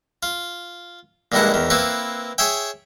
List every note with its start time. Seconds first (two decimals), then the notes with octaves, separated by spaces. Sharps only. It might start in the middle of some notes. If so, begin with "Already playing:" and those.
0.23 F4
1.32 A#1 G2 D#3 G#3 E4 F#5
1.54 E2 D#3
1.70 A#3 C4 E4 B4
2.38 G#4 C#5 E5 G5